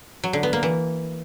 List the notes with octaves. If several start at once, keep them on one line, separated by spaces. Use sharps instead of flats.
F#3
D3
B3
A#3
E3